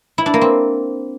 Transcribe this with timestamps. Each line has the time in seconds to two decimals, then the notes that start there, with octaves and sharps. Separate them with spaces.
0.18 E4
0.26 D4
0.34 A#3
0.41 C4